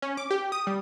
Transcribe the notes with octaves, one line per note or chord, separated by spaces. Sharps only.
C#4
D6
G4
D#6
G3